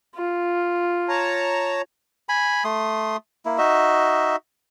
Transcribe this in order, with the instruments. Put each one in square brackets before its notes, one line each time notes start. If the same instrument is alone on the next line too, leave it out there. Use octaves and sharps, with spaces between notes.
[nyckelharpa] F4
[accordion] C#5 A5 A#5
[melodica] G#5 B5
A3 C6 D#6
A#3 E4
D#4 F#4 D#5 E5